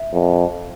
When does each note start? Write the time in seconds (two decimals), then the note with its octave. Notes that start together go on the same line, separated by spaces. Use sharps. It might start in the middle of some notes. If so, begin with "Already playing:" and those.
Already playing: E5
0.13 F2